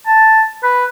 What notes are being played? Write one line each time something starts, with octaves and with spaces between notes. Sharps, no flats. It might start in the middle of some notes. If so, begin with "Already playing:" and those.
A5
B4